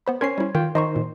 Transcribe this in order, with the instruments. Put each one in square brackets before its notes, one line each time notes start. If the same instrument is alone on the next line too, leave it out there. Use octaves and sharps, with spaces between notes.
[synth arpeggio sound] B3 C5 B5
[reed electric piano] C#4 C5 G#6 [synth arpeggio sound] A#4 C7
[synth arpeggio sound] G3 E4
[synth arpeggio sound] D#3 [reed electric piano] F4 G5
[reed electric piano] D#3 C5 [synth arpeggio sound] D#5 A#5 C#6
[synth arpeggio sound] A#2